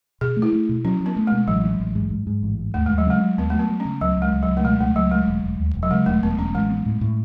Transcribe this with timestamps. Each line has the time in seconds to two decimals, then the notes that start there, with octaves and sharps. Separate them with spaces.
0.21 B2 G#4
0.37 A3
0.42 E4
0.53 A3
0.69 B2
0.85 F#3 C#4
1.00 F#3
1.06 B3
1.16 A3
1.27 B2 G#3
1.48 A1 F#3
1.64 D#3
1.80 A1
1.95 G#2
2.11 G#2
2.27 G#2
2.43 A1
2.59 G#2
2.74 D#2 A3
2.86 D#2 G#3
2.98 F#3
3.06 C#3 G#3
3.22 F#3
3.38 D#2 B3
3.50 A3
3.54 F#3
3.59 B3
3.69 F#3
3.80 C#4
3.85 C#3
4.01 C#2 F#3
4.17 C#2
4.22 G#3
4.33 C#2
4.43 F#3
4.49 C#2
4.57 A3
4.64 B2 G#3
4.80 C#2 A3
4.96 C#2 F#3
5.11 G#3 A3
5.28 E1
5.44 E1
5.60 D#2
5.75 E1
5.83 F#3
5.91 C#3 G#3
6.06 E1 A3
6.23 E1 B3
6.38 E1 C#4
6.54 A1 G#3
6.70 B3
6.86 A2
7.01 A2